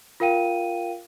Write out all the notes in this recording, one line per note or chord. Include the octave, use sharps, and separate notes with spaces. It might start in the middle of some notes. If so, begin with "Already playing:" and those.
F4 A#4 F5 G5 D#7